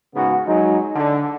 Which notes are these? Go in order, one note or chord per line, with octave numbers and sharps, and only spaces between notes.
G#2 C#3 B3 F#4
F#3 G#3 D#4
D3